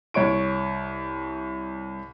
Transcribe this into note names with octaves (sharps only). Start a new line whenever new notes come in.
C2 C#5 C#6 D7